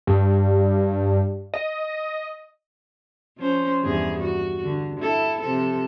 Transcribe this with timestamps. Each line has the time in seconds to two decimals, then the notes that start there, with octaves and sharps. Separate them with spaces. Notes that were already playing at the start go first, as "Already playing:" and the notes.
0.07 G2
1.54 D#5
3.38 F3 C#4 C5
3.83 E2 G2 G#4
4.19 F#4
4.64 D3
5.00 E4 A4
5.41 C3 F3 A4